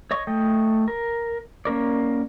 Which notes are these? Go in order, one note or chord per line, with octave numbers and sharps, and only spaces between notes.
C#5 D#5 C#6
A3 D#5 G5
A#4
A#3 C#4 A#4 D5